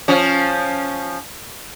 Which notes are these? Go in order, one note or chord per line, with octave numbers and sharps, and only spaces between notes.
F3 C#4